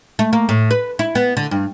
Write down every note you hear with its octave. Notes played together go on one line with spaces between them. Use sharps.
A3
A#3
A2
B4
E4
B3
D3
G2